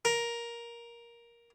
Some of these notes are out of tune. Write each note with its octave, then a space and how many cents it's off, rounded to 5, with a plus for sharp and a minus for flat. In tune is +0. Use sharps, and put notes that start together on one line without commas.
A#4 +10